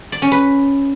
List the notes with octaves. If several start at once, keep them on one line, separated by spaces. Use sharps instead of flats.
D5
C#4
B4